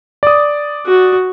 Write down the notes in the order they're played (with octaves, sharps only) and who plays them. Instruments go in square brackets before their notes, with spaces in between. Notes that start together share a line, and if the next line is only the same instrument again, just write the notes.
[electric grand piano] D5 D#6
[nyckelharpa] F#4